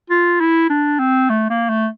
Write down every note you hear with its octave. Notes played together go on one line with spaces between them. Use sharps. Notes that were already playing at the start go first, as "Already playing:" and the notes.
F4
E4
D4
C4
A3
A#3
A3